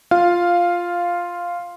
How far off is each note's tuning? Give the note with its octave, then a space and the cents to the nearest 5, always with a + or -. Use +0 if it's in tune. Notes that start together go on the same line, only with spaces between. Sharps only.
F4 +0 F5 +0